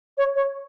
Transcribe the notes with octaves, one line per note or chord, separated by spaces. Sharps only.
C#5
C#5